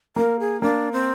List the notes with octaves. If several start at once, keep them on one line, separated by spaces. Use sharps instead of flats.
A#3 A#4
G#4
A#3 D4
C4